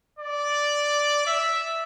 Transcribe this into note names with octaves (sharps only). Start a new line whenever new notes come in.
D5
E5